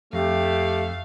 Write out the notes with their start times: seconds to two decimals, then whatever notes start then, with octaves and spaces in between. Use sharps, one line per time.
0.13 F2 A3 G4 F5